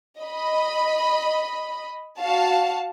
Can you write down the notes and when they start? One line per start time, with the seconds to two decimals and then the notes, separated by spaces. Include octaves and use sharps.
0.20 D#5 B5
2.19 F#4 F5 A5